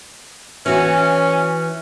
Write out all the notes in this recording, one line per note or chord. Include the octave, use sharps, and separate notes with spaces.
E3 C#4 F#4